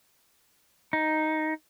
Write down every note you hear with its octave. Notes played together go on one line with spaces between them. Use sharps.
D#4